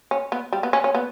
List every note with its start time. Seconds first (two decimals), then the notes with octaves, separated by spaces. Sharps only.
0.11 C#4
0.32 B3
0.53 G3
0.63 B3
0.73 C#4
0.84 C#4
0.95 B3